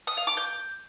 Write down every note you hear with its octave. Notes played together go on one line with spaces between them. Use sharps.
D#6
F5
D6
G6